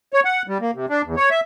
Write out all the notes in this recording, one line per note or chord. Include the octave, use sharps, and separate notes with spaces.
C#5
F#5
G3
A#3
C3
D4
E2
C#5
E5